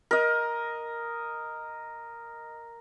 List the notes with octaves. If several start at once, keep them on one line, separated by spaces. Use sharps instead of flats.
A#4 D#5